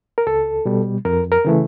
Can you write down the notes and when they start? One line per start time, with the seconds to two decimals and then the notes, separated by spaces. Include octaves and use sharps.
0.18 A#4
0.27 C#2 A4
0.65 B2 G3
1.05 F2 A#4
1.32 A#4
1.45 C#3 E3 A3